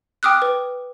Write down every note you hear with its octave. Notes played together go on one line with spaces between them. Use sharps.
G5 D6 D#6 F6 F#6
B4